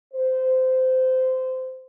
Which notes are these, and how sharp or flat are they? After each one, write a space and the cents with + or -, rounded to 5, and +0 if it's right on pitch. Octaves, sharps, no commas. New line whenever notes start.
C5 -20